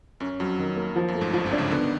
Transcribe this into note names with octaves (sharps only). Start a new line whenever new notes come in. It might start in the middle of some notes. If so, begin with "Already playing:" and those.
F#2 C#4
F2 F#3
D#3
A#3
F3
F#2
A3
G#1 G#2
G1 G2 F3
C2 C3
D4
C#2 C#3
D3 B3
D#3